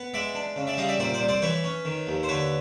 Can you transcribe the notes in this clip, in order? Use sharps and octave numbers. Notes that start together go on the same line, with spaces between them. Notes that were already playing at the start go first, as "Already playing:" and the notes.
Already playing: B3
G#3 D5 E5
D4
C#3
D5 E5
G3 D#5 F5
D5 E5
A#2 C5 D5
C5 D5
C2
C5 D5
E3 B4 C#5
C#4
D#3
D#2
C5
D3 B4 C#5